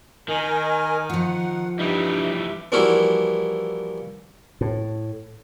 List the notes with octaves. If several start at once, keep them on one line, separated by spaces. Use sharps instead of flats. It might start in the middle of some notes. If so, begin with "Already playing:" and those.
D#3 A#4 D#5 G#5
F3 F4 F#5
G2 E3 G3 D#4 E5
E3 F3 G3 A#3 E4 F#4
A2